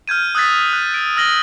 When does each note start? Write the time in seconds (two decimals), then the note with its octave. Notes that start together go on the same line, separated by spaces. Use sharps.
0.08 F6 G6 G#6 D#7
0.35 D#6 E6 F#6 G#6 A6 B6
0.73 F#6
0.94 D7 D#7
1.17 E6 F6 A#6 F#7 G7